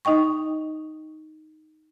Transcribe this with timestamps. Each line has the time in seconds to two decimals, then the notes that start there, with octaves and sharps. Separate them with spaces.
0.05 D#4 D#5 G5 C#6